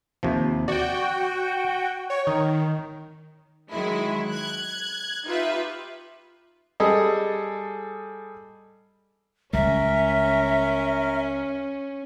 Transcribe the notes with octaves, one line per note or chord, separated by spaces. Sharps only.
D#2 C3 F3
F#4 D5 G5
C#5
D#3 D#4
D#3 F#3 G#3 E4
F#6 G#6
D#4 F4 G4 B4 E5
G3 G#4 A4 D#5
C#2 G3 C#4 A#4 E5